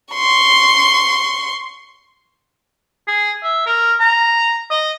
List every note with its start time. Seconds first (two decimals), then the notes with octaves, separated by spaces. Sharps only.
0.13 C6 C#6
3.08 G#4
3.43 E5
3.67 A#4
4.00 A#5
4.71 D#5